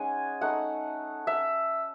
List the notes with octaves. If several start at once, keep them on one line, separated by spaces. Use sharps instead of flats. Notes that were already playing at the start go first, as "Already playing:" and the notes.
Already playing: G#3 C#4 D#4 F#5 G#5
A3 D#4 F#5
E5